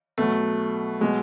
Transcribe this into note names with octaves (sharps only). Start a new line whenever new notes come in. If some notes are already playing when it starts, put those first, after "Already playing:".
B2 F#3 A3
B2 F#3 G#3